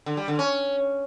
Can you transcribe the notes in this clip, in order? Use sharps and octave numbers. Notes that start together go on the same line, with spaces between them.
D3
G3
D3
C#4